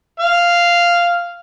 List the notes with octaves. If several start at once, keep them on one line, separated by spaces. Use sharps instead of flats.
F5